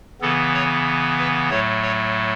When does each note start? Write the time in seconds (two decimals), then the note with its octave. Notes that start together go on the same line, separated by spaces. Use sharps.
0.21 C#3 E3 B3 A4
0.54 C#5
1.18 B4
1.50 A2 F#3 A3 C#5
1.82 C#5